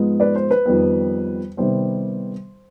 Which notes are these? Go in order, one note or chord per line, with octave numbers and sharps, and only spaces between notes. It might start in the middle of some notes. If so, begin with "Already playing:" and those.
Already playing: G#2 F3 G#3 B3
B4 D5
C5
B4
F2 D#3 G3 B3
C3 D#3 G3 B3 C5